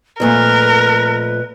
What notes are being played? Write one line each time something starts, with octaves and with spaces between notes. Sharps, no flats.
F2 A#2 A3 A#4 B4